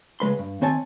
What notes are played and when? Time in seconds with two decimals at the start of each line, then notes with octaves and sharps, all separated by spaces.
0.20 C#2 G#3 B4 C6
0.39 G2
0.61 D#3 C4 C#5 G#5 A5